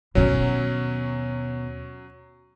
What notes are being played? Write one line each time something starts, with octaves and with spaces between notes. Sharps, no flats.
D#2 B2 F#3 C#4